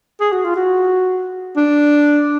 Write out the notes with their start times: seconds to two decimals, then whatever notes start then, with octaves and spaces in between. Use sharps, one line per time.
0.20 G#4
0.32 F#4
0.44 F4
0.56 F#4
1.57 D4